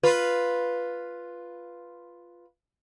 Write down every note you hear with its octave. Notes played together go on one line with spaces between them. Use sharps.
F4 B4